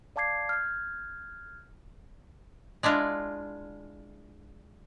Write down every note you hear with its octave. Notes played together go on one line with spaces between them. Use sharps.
D5 F5 A5 D6 G#6 C7
F6 G6 G#6
G#3 D4 E4 F4